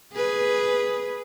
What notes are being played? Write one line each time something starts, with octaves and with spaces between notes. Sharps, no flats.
G#4 B4